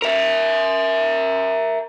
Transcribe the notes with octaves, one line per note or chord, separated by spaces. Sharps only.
A#4 E5